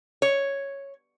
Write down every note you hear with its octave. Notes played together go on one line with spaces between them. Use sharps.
C#5